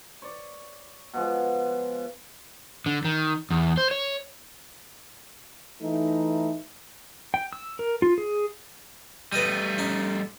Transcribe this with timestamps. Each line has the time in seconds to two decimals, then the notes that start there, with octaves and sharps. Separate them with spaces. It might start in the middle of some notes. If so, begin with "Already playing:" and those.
0.22 C#5 D5
1.14 B2 F3 G#3
2.86 D3
3.05 D#3
3.51 E2
3.77 C5
3.91 C#5
5.81 E3 A3 D#4
7.34 G5
7.53 E6
7.79 A#4
8.02 F4
8.18 G#4
9.33 G3 A3 B4 D#5 D#6
9.78 C#4 D#4 A5